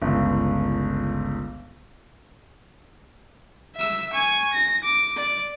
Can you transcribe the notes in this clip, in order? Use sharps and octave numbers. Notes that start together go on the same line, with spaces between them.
G1 C#2
E5 E6
G#5 C#6
A#6
D6
D5